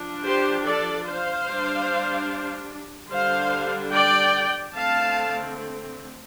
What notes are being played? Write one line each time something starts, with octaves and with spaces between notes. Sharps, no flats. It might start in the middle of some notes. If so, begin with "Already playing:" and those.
Already playing: F3 D4
G4 C5
A4 D5
C5 F5
G3 D4
D3 G3 D4 C5 F5
D5 G5
D3 A3 C4 F5 A5